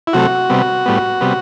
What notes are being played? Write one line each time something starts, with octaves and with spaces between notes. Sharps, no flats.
E4
C3 F#3 A3 F#4
C3 G3 B3
A2 G3 B3
C3 G3 B3